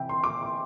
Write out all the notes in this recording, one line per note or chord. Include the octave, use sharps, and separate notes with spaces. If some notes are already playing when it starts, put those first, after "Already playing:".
Already playing: C3 E3 C4 E5 G5
C6
D6
C6
C6